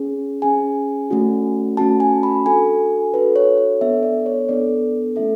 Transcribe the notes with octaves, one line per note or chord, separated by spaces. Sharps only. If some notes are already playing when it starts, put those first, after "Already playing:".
Already playing: C#4 G#4
C#4 G#4 G#5
A3 C#4 F#4
A3 C#4 F#4 A5
G#5
B5
D4 F#4 A4 G#5
D4 F#4 A4 B4
C#5
C#5
B3 D4 A4 E5
D5
C#5
B3 D4 A4 D5
A3 C#4 E4 A4 E5